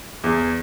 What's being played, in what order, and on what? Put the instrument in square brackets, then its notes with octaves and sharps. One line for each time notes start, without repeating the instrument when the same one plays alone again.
[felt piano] E2